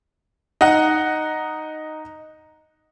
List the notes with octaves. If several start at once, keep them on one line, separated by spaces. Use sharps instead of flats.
D#4 F#5